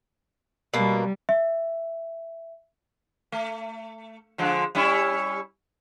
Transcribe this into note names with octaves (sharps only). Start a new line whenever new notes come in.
B2 G3 A#3
E5
A3
D3 F3 G#3
G3 C#4 E4